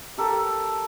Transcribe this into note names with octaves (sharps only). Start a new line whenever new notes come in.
G4 A4 A#4